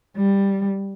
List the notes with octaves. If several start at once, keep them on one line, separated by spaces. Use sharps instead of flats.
G3